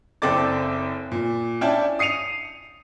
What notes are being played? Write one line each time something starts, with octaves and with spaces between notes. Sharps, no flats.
F#1 C4 A4 D5 D6 A6
A#2
C#4 D4 E4 D5 G5 A5
D#6 C7 C#7 D#7 F7